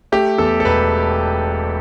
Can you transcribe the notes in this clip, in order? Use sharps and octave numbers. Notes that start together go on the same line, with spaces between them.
A3 G4
E2 A4
A4
E1 B4